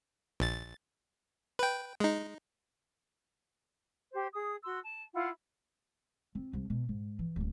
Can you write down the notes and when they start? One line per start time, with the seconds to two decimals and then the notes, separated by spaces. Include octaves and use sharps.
0.40 A#1 A6
1.59 B4 G5
2.00 G#3 D#4
4.12 G4 C5
4.32 G#4 D#6
4.65 F#4 C6 E6
4.83 A5
5.13 E4 F4 F5 F#5
6.35 C4 F4
6.53 C2
6.70 B2
6.89 G#2
7.19 E3
7.36 D1 C#4